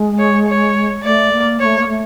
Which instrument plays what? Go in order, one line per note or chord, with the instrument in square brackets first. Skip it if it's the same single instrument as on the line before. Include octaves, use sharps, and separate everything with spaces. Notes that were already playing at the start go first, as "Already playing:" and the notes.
Already playing: [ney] G#3
[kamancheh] C#5
C#5
[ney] A3 [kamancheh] D5
[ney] A#3
[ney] A#3 [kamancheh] C#5
[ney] A3
A#3
A3